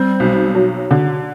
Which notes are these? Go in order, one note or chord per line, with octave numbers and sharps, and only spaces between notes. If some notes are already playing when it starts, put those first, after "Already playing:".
Already playing: G3 C4
B1
F#3
D3